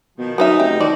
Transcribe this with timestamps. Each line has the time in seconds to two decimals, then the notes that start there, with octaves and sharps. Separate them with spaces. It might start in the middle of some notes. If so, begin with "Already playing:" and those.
0.18 B2 D#3 F3
0.38 F#3 B3 C#4 D#4 E5
0.60 F1 G4
0.80 D#3 F3 E4 F#4 D5